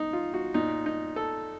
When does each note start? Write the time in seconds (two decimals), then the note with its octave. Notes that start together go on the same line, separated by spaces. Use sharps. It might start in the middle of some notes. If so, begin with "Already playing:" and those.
Already playing: D#4
0.13 F4
0.34 F#4
0.54 A#2 D#4
0.86 D#4
1.16 A4